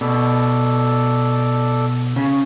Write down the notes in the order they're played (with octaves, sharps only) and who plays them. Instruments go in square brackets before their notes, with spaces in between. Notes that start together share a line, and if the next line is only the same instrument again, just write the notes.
[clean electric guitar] B2 [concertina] A4 D5
[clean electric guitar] C#3